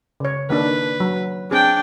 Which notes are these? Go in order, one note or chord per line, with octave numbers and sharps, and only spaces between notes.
C#3 C#5
D#3 A#3 D4 B4
F#3
C4 D4 G#4 G5